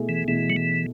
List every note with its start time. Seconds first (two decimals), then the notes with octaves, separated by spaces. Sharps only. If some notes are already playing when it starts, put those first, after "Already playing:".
Already playing: B2 A3 E4 G#4
0.09 E3
0.28 B2 E3 A3 E4 G#4
0.50 F#3
0.56 E3